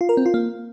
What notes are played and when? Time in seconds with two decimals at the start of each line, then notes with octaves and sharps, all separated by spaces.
0.01 F4
0.09 A#4
0.17 C4
0.26 F4
0.34 A#3